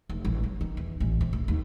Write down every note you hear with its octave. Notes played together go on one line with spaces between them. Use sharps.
F1
A1
F#3
D#3
E2
A1
C3
D2
D#2